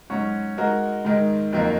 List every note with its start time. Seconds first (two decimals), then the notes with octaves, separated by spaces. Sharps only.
0.10 G#2 F#3 C#4 F#4
0.57 G#3 D#4 F#4 A#4
1.05 G#2 D#3 G#3
1.53 F2 D#3 F#3 A#3